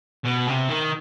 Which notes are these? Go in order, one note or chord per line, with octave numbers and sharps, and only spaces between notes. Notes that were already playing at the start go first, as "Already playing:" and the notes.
B2
C3
D#3